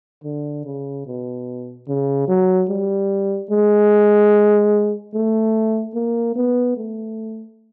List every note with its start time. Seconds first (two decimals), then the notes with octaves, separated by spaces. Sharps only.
0.24 D3
0.65 C#3
1.06 B2
1.88 C#3
2.28 F#3
2.69 G3
3.51 G#3
5.14 A3
5.95 A#3
6.36 B3
6.77 A3